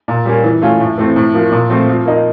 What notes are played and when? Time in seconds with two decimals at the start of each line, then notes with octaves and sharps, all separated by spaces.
0.08 A#2
0.25 G3 A#3 C#4
0.44 E3
0.62 A3 C#4 F4
0.80 A2
0.98 E3 A3 C4
1.16 A2
1.34 F3 A#3
1.52 A#2
1.70 F3 A3 C4
1.88 F3
2.06 A#3 D#4